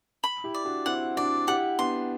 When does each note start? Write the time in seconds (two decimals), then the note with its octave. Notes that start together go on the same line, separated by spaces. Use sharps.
0.24 B5
0.44 E4 G4
0.54 D5
0.65 D4 F#4
0.86 C4 E4 F#5
1.17 D4 F#4 D5
1.48 E4 G4 F#5
1.79 B3 D4 C6